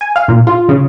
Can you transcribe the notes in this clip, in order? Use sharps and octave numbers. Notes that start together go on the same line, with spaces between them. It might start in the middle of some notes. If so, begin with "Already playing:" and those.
G#5
F5
A#2
F4
C#3